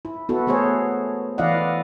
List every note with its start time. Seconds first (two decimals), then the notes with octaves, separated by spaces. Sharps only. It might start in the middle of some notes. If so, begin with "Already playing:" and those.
0.05 E4
0.29 B3 E4 F#4 A4
0.47 A3 B3 G#4 C5 C#5
1.38 E3 E4 D5 D#5 F5 F#5